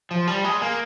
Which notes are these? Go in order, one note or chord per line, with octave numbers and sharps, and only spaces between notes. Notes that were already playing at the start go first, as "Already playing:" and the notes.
F3
G3
G#3
A#3